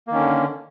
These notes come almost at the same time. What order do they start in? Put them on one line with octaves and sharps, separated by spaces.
A#3 D#3 C#4 D3